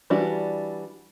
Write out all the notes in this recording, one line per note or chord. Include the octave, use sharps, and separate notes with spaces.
E3 G3 D4 E4 F#4